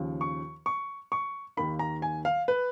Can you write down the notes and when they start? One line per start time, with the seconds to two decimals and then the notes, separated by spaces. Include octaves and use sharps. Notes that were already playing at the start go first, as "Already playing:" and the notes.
Already playing: D#2 C#3 F3
0.21 C#6
0.66 C#6
1.12 C#6
1.57 D#2 D#3 A#3 B5
1.79 A#5
2.02 G#5
2.25 F5
2.48 B4